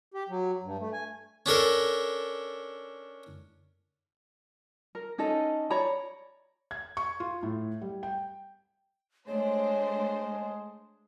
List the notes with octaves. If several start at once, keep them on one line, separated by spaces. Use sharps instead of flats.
G4
F#3
G2
A3
G#5
C#4 D4 A4 A#4
A#4
C#4 D#4 A4 D#5
C#5 D5 A#5 B5
G#6
C#6
F4
A2
G3
G5
G#3 A3 D4 C5 C#5